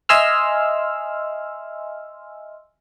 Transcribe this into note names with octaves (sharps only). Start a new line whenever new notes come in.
D#5 E5 G#5 C6 E6 F6